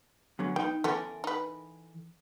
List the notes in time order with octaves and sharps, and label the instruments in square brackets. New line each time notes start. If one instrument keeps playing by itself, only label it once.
[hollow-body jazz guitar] E2 D3 F#3
[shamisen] B3 [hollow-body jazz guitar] D#4 G5
[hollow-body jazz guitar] E3 A4 A#4 [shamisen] B3 C#4 E4
[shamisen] D#4 B4